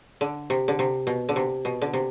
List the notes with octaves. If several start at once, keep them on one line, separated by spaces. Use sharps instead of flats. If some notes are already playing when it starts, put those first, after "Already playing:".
D3
C3
D3
C3
B2
D3
C3
B2
D3
C3